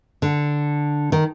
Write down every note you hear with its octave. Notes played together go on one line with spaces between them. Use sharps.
D3
D#3